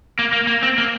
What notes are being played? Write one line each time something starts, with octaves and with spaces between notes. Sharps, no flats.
A#3
A#3
A#3
C4
A#3